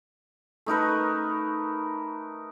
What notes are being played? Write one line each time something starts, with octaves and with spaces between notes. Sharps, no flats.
A3 D#4 A#4 B4